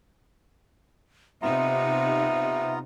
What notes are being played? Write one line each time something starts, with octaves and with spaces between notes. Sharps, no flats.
C3 B3 D#4 F4 E5 A#5